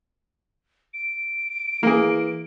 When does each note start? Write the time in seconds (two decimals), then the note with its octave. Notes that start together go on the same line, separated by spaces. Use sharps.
0.94 D7
1.83 E3 A#3 G#4